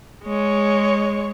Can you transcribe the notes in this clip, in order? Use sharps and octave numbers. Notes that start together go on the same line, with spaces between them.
G#3 C#5